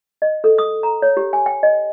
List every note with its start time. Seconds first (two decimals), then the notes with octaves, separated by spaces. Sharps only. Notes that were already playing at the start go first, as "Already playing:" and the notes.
0.22 D#5
0.44 A4
0.58 D#6
0.83 A#5
1.02 C#5
1.17 G4
1.33 G#5
1.46 G5
1.63 D#5